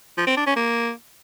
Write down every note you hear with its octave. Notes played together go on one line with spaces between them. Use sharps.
F3
C4
D4
C#4
A#3